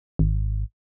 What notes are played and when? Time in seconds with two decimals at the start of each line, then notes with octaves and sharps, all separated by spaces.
0.19 G#1